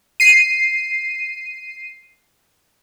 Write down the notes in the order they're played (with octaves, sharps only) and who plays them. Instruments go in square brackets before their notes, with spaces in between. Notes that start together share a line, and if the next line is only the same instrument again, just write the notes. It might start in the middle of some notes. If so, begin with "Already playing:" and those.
[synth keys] C7 D#7